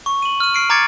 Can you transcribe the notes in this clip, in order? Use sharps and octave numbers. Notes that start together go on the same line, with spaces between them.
C#6
D#7 F#7
F6 D#7
F6 C7 D7
A#5 D6 G#6 A6 C#7 D7